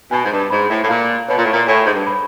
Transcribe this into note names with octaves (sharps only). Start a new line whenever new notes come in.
B2 G#5
G#2
G2
G#2 B5
A2
A2
A#2 F5
B2 C#5
A#2
A2
A#2
A2 G#5
G#2
G2
B5